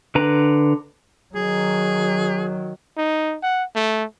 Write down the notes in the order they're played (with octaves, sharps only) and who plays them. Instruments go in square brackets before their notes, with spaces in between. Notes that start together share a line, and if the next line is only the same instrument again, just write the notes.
[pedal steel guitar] D3 B4 A#5
[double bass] D#3 F#3 [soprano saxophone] G#4
[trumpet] D#4
F#5
A3